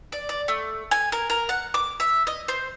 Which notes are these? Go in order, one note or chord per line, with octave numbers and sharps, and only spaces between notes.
D5
D5
A3
G#5
A#4
A#4
F#5
D6
E5
D#5
C5